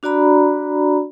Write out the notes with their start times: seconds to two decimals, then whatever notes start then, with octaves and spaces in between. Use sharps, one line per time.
0.03 D4 F#4 D5 A#5 B5